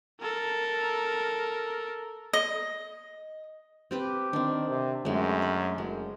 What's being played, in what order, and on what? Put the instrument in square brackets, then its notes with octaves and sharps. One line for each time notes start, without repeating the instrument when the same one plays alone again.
[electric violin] A4 A#4
[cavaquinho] D#5
[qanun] C4 G4 B4
[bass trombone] D#3 [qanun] C4 D4
[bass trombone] C3
[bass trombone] F#2 [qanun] G#3 A3
[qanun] B5
[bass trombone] F#1 [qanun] G#3